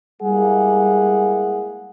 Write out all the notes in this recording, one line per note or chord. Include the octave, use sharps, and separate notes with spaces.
G3 G#3 A#3 E4 G#4 F#5